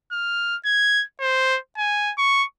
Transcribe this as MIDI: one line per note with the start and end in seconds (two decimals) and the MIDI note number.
0.12 0.56 89
0.65 1.03 92
1.20 1.58 72
1.78 2.12 80
2.18 2.44 85